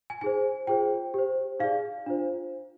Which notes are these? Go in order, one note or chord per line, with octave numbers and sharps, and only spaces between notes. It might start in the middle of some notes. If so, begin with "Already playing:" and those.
G#5
D#4 G#4 C5 G#5
F4 G#4 C5 G5
G4 C5
D#4 G#4 D5 F5
D4 F4 C5